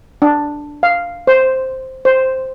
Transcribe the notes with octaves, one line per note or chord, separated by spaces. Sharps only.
D4
F5
C5
C5